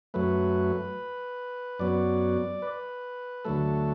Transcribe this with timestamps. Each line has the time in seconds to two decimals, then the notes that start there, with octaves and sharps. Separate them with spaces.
0.14 F#2 F#3 A3 B4
1.79 F#2 F#3 B3 D5
2.62 B4
3.45 D2 D3 F#3 A3 A4